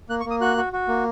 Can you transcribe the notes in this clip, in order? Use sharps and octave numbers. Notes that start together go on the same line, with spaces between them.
A#3 F#6
C#6
A#3
D#6
F#4 F#6
F#4
F#4
A#3